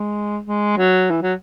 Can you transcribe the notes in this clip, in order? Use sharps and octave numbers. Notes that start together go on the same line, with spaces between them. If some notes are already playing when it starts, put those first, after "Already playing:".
Already playing: G#3
G#3
F#3
E3
F#3